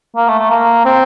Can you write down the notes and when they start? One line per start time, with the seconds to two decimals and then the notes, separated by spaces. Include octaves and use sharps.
0.16 A#3
0.28 A3
0.39 A3
0.50 A#3
0.85 C4